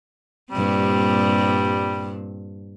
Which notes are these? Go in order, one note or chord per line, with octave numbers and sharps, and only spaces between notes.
G2 A#2 G3 C4